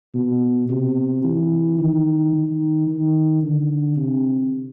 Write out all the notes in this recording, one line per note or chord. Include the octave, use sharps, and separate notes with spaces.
B2
C3
E3
D#3
D#3
D#3
D3
C3